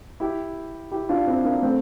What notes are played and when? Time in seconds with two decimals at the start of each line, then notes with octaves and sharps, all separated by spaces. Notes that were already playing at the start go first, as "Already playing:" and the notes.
0.20 E4 G4
0.91 E4 G4
1.09 D4 F4
1.27 C4 E4
1.44 A#3 D4
1.62 A3 C4